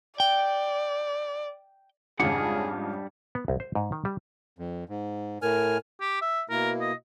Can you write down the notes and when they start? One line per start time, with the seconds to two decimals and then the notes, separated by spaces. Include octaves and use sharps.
0.20 D5 G5
2.20 F2 G#2 C#3 G3 D4 G#4 F#5
3.35 B3
3.48 C2
3.60 C5
3.75 G#2
3.92 D#3
4.05 G3
4.59 F2
4.89 G#2
5.42 A2 A#4 G#5 F6
6.01 G4
6.22 E5
6.50 B2 A#3 E4 A#4
6.81 D#5